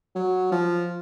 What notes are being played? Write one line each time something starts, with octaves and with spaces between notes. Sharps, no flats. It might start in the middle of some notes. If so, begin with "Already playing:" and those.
F#3
F3